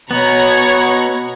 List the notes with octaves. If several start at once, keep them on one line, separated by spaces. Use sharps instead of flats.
B2 B3 C#5 A#5 B5 C#6